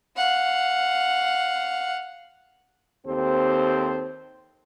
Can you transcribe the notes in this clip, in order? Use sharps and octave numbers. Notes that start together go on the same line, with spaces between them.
F5 F#5
D#2 C4 G4 A4 C5